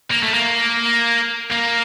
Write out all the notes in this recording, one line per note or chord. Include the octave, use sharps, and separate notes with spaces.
A#3
A3
A#3
A#3